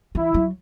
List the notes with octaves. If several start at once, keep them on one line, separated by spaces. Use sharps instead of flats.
E3 E4
F#3